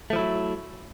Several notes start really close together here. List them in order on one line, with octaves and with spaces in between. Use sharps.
A3 F3 E4 F#3